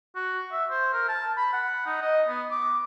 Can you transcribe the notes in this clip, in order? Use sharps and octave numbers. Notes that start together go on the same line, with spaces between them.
F#4
E5
C5
A#4
A5
B5
F#5
D#4
D#5
B3
D6